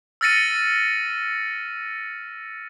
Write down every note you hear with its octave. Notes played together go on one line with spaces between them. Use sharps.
E6 F6 A6 A#6 C#7 D#7